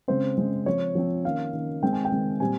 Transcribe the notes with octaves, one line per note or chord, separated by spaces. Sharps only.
C#3 G#3 C4 C5
C#3 G#3 C4
F3 C4 C#5
F3 C4
D#3 A#3 C#4 F5
D#3 A#3 C#4
D#3 G#3 C4 G5
G#5
G5
D#3 G#3 C4
A#2 G3 C4 G#5